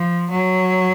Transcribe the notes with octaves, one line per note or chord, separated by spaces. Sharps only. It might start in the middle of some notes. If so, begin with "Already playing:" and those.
Already playing: F3
F#3